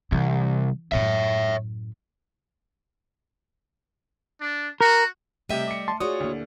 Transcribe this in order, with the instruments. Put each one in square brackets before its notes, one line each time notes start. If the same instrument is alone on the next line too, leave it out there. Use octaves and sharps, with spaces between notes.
[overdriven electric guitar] C2 [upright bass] E3
[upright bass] F#2 A2 [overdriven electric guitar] C#5 E5
[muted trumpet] D4
[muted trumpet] F#4 [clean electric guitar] A#4
[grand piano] C3 G4 D#7 [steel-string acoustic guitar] G3 D#5 E5 [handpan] A3
[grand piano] D6 C#7
[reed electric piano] A5 C6
[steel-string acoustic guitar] F4 F#4 C#5 [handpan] G#4 D5 [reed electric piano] D#6
[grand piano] D2 [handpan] A#3 E4